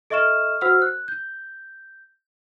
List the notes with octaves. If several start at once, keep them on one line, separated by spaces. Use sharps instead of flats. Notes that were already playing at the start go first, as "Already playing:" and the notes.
A4 D#5 E5 C#6 F6 E7
F#4 C5 F#5 E6 F6
F#6
G6